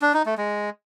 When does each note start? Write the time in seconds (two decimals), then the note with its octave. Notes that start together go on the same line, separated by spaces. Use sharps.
0.02 D4
0.14 D#4
0.26 A3
0.38 G#3